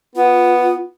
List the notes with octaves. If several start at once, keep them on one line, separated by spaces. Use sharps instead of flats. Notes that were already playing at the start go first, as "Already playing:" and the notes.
B3 F4